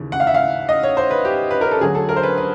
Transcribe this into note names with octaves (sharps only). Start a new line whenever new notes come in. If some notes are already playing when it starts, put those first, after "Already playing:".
Already playing: D#2 C#3 E3
F#5
F5
E5
F5
D#5
C#5
C5
B4
G4
B4
A#4
A4
D2 D3 F#3 G#4
A4
A#4
C5
B4
B4